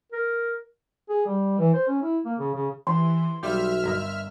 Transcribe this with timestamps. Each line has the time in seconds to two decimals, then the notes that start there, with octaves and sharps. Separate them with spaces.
0.12 A#4
1.09 G#4
1.27 G3
1.59 E3
1.74 C5
1.88 C#4
2.02 E4
2.25 A#3
2.39 C#3
2.55 C#3
2.87 E3 C6
3.43 B1 G3 F4 G4 E5 F6
3.84 G1 A#4 D#5